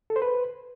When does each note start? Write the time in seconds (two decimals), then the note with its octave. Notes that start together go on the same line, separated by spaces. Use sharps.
0.10 A4
0.16 C5
0.22 B4